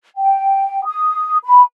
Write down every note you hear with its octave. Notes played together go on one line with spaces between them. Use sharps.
G5
D#6
B5